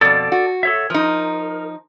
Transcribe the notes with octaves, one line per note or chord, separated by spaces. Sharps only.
F2 B2 A4 D5
F#4
A4 C#5 E5
F3 D#4 A#4